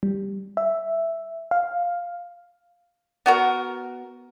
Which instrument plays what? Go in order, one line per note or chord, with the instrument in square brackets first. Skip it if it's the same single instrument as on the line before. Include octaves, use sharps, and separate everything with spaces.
[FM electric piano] G3
E5
F5
[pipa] B3 F#4 A#4